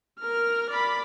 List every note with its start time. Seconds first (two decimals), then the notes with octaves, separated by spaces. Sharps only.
0.19 A#4 F6
0.70 D5 B5